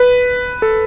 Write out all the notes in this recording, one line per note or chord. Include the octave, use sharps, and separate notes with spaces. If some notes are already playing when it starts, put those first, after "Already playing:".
Already playing: B4
A4